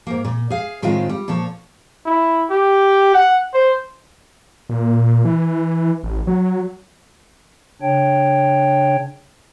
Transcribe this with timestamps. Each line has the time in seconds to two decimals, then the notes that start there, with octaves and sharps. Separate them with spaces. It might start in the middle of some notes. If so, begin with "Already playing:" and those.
0.07 G#2 A#3
0.24 A#2
0.50 G#4 F5
0.82 A2 D#3 G#3 C4 F4
1.09 G3
1.28 A#2 F3 A4 C#5
2.06 E4
2.50 G4
3.14 F#5
3.54 C5
4.69 A#2
5.25 E3
6.03 A1
6.27 F#3
7.82 C#3 D4 C#5 G5